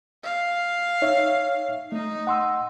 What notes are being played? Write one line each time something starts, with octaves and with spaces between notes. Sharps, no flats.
F5
D#4 C#5 E5
A3 D#4
F#5 C6 E6